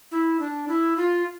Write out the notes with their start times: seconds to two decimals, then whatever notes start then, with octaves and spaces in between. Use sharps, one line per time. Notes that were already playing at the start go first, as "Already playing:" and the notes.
0.11 E4
0.40 D4
0.68 E4
0.97 F4